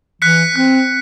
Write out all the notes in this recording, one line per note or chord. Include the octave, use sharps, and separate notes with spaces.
E3 F#6 B6 C#7
C4 F#6